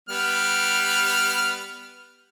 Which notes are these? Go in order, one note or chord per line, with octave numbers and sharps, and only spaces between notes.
G3 B3 F6